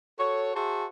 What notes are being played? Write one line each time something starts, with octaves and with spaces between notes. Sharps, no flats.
F#4 A4 C#5
F#4 G#4 C5 E5 A5